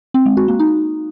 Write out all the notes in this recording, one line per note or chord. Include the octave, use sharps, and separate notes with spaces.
C4
G#3
F#4
A#3
D#4